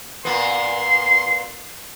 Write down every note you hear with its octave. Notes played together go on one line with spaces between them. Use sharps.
A#2 B3 C6